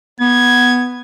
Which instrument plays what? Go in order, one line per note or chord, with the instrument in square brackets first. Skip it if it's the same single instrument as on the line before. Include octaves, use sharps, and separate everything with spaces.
[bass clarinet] B3 [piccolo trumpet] G#6